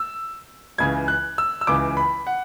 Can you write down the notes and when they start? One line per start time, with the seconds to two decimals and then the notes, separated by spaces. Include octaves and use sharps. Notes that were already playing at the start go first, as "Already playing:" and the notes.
Already playing: E6
0.78 C#2 C#3 E3 G#6
1.08 F#6
1.38 E6
1.61 E6
1.67 C#2 C#3 E3 D6
1.97 B5
2.27 F#5